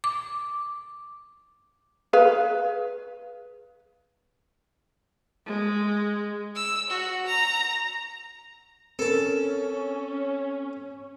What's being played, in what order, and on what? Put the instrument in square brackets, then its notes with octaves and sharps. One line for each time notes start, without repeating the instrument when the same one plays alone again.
[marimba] D6
[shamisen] G#4 B4 F5
[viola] G#3
[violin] E6
F#4
A#5
[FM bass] C4 [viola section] C#4 [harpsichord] A4 A5 [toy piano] A#4